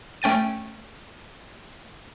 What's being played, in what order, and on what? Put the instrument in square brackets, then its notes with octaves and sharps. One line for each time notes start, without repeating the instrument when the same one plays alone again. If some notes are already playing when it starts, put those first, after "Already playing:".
[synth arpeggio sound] A3 C#4 G5 A6 D#7